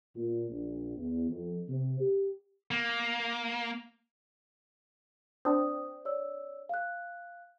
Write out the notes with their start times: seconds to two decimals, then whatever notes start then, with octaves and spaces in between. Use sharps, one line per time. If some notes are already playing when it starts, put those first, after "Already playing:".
0.16 A#2
0.51 A#1
0.97 E2
1.30 F2
1.69 C3
2.00 G4
2.71 A#3
5.45 C4 D4 D#6
6.05 C#5 D5 E6
6.69 F5 F#6